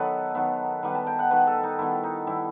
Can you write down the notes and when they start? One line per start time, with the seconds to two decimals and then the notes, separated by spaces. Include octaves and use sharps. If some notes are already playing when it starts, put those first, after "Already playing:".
Already playing: D#3 F#3 B3 A4 B4 D#5
0.35 D#3 F#3 B3
0.83 D#3 G3 B3 B4
0.95 A5
1.07 G5
1.19 F#5
1.31 D#3 G3 B3 B4
1.47 A4
1.63 D#4
1.79 D#3 G3 B3 E4
2.03 D#4
2.27 D#3 G3 B3 E4